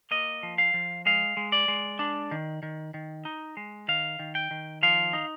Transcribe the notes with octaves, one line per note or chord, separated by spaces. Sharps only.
A#3 D#5
F3
F5
F3
G#3 F5
G#3
D5
G#3
D4
D#3
D#3
D#3
D#4
G#3
D#3 F5
D#3
G5
D#3
F3 F5
D#4